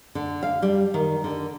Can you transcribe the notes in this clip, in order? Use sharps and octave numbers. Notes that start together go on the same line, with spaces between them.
D3
F5
G3
D#3
D3